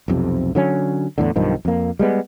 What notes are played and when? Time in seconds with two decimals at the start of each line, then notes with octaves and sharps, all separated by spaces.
0.08 B1 F2 C3
0.55 D3 F#3 C#4
1.18 E2 A2 D3
1.36 B1 G2 D#3 F3
1.65 F2 A#3
1.99 G3 G#3 B3